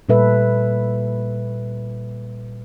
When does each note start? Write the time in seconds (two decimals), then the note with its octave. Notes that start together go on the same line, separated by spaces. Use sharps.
0.09 A#2 G3 A4 B4 E5